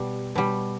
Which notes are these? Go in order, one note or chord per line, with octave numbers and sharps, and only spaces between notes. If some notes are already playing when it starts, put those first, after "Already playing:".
Already playing: B2 G3
B2 G3